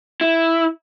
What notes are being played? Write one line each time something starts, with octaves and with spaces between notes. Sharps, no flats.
E4